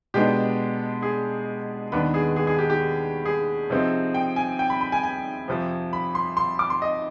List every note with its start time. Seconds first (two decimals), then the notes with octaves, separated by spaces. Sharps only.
0.14 B2 G#3 B3 D4 G4
1.02 G#4
1.92 D#2 D#3 B3 D4 B4
2.14 G#4
2.36 G#4
2.47 G#4
2.59 G4
2.70 G4
3.25 G#4
3.70 C3 F3 C4 D#4
4.14 G5
4.36 G#5
4.59 G5
4.70 B5
4.81 B5
4.92 G#5
5.03 G#5
5.48 F2 C3 F3
5.93 B5
6.15 C6
6.37 C6
6.59 D6
6.70 C6
6.82 D#5